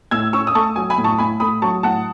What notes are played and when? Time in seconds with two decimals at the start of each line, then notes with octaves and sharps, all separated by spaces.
0.11 A2 E6 G#6
0.33 C#4 C#6 E6
0.47 D#6
0.55 A3 A5 C#6
0.76 F#3 G#5
0.90 G#5 B5
0.98 A2
1.04 A5 C#6
1.18 A2 G#5 B5
1.40 A3 B5 D#6
1.62 F#3 A5 C#6
1.83 A2 F#5 A5